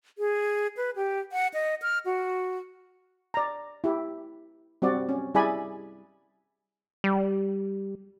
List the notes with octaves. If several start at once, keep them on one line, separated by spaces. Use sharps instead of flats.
G#4
B4
G4
F#5
D#5
F6
F#4
D5 A#5
E4 G4
G3 C4 F#4 D5
C#4
G3 E4 G#4 D5 G#5 B5
G3